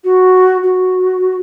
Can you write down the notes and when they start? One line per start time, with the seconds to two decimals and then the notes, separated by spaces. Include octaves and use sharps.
0.04 F#4
0.63 F#4